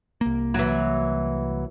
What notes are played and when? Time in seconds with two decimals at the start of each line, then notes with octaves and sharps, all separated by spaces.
0.21 C2 A#3
0.54 E3 F#3